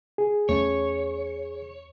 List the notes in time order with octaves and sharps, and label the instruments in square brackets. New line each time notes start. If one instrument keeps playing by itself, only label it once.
[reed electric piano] G#4
[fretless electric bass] E2 A3 C#4 [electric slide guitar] C#5